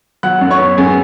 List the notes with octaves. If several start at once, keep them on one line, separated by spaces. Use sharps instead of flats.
F#3 F#5 F#6
F#2
C#5 C#6
B3
F#2 G#4 G#5